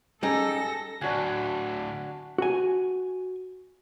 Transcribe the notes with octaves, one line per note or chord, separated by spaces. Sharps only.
G3 C#4 D#4 G#4 A4 A#6
D2 A2 D4 F#4 G#5
F#4 G#5